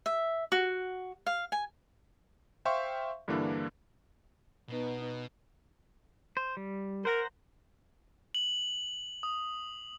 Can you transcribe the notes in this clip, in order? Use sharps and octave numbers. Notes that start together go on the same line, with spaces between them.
E5
F#4
F5
G#5
C5 E5 F5 G5 C6 C#6
G2 D3 E3 A#3 D4 E4
B2 B3 D#4
C5
G3
A#4 C5 F#5 A#5
F#7
D#6